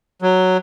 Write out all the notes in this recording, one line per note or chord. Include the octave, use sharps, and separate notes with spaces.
F#3